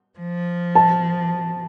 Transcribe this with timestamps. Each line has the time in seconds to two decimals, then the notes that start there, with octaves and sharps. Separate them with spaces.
0.19 F3
0.75 A5